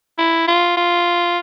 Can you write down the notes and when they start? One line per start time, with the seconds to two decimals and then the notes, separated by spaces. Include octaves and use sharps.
0.18 E4
0.47 F4
0.77 F4